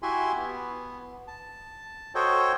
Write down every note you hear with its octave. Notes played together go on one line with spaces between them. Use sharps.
E4 F#4 G4 E5 G#5 C6
B3
A5
F#4 A4 C5 C#5 D#5 G5